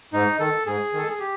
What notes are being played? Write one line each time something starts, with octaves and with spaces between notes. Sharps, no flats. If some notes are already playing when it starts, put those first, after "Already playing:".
G#2 D#4
D#3 A4
G#2 G#4
D#3 A4
G#4
G4